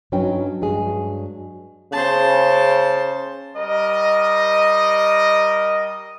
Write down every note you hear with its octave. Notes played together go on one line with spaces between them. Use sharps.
G2 F#3 C#4 D#4 B4 G5
G2 F#3 G#3 G#4
C#3 C5 A5
G3 A#4 D#5